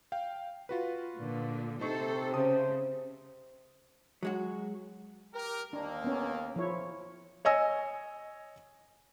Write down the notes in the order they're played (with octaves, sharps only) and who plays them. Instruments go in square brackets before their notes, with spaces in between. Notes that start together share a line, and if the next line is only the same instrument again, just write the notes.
[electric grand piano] F5 G5
F4 F#4 B4
[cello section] A#2 D3
[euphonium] C3 [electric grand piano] D#4 C#6 [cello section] A4 C5
[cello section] C#3 [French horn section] C5 [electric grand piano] A5 D#6
[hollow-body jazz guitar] F#3 G#3 F#4
[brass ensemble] G4 A#4
[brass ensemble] D#2 A#3 [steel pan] D4
[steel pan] B3 C#4
F3 E4 C#5
[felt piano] C#5 D#5 G#5 E6 A#6